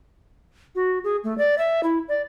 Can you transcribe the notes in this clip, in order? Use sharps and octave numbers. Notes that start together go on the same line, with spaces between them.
F#4
G#4
A3
D5
E5
E4
D5